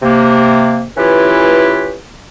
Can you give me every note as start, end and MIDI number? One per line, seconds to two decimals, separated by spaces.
0.02 0.84 48
0.02 0.84 58
0.97 1.96 52
0.97 1.96 61
0.97 1.96 64
0.97 1.96 65
0.97 1.96 67
0.97 1.96 71